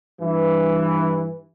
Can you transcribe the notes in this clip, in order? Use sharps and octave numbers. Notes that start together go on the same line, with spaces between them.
G2 E3